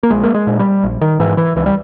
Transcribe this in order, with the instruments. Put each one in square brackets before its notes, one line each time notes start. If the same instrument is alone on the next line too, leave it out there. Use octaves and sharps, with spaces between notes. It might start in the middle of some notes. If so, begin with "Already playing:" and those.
[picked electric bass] A#3
A#1 G#3
A#3
G#3
A#2
G3
A#1
D#3
G#2 E3
E3
C#2 E3
G3